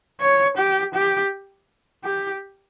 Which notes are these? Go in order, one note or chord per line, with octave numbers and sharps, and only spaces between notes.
C#5
G4
G4
G4